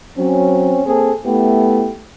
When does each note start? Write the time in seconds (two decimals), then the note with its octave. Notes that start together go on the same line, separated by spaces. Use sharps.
0.17 F#3 C4 C#4
0.86 A#3 C4 G#4 A4
1.25 A3 B3 E4 G4